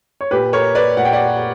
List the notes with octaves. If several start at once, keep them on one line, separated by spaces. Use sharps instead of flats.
C#5
A#2 G4 B4
A#4 C#5
B4 D5
A#2 F#5
G5
D5 F#5